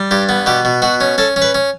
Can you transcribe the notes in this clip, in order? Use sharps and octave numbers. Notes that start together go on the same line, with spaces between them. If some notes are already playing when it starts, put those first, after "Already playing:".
Already playing: G3
G2 G4
B3
B2 G4
B2
B2 F#4
C#4
C#4 A4
C#4
B4
C#4